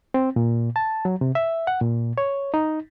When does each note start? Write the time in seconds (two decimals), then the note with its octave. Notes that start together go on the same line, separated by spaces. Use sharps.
0.14 C4
0.36 A#2
0.76 A5
1.05 F#3
1.21 C3
1.35 E5
1.67 F#5
1.81 A#2
2.18 C#5
2.54 D#4